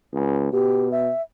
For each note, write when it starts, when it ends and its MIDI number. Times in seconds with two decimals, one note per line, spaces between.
0.13 0.50 37
0.52 1.11 47
0.52 0.88 67
0.91 1.22 76